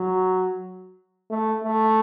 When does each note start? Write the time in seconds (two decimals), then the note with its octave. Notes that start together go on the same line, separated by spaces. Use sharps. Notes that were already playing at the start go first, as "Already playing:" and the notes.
Already playing: F#3
1.30 A3
1.64 A3